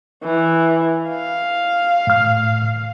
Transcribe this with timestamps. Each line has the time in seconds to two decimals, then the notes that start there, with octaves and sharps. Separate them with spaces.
0.23 E3
1.09 F5
2.07 A2 F6